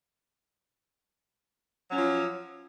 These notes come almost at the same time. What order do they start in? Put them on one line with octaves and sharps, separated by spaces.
F#3 C#4 F3